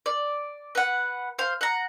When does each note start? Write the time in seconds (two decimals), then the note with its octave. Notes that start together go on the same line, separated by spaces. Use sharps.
0.06 D5
0.75 B4 F#5
1.39 C5 F5
1.61 F#5 A#5